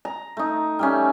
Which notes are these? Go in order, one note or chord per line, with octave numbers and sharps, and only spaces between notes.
A#5
A3 D#4
G3 A3 C#4